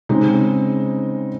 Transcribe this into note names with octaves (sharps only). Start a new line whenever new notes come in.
C#3 G#3 C4 D#4